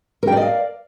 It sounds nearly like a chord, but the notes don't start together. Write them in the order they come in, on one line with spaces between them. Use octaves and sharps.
A#4 G5 D5 D#5 F5